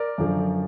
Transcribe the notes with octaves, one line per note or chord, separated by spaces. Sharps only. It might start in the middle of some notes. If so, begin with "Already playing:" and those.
Already playing: A#4 D5
F#2 D3 F3